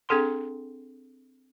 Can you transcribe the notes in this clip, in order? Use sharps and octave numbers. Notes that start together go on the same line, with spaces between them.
C4 D4 G#4 A4 F#5 C6